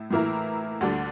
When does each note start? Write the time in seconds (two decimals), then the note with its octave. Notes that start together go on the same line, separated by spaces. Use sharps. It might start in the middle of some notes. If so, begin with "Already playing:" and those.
Already playing: A2 E4
0.11 A2 E3 A#3 E4 A#4
0.81 D2 D3 G3 D4